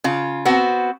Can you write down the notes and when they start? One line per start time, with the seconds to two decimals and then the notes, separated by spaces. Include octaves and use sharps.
0.04 C#3 F4
0.45 B3 C4 F#4